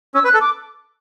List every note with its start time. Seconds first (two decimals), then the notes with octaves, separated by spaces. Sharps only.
0.15 C#4 E6
0.24 B4 F#6
0.34 A4
0.41 D6